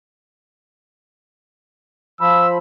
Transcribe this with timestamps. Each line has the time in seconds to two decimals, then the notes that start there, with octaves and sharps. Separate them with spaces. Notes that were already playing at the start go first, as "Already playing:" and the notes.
2.21 F3 B5 E6